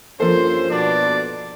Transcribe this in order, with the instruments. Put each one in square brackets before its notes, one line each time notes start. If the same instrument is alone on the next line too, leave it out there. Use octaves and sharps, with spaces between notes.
[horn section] G2 C#4 C5 [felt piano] F3 A#3 A4
[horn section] B2 D4 [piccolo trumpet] D5